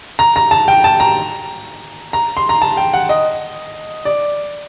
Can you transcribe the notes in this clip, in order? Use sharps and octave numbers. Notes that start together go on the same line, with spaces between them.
A#5
A#5
A5
G5
A5
A#5
A#5
C6
A#5
A5
G5
F#5
D#5
D5